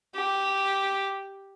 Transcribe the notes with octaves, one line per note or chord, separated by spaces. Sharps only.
G4